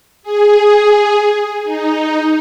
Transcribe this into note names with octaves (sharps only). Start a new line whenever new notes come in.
G#4
D#4